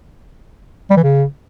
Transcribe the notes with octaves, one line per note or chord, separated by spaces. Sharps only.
G3
E3
C#3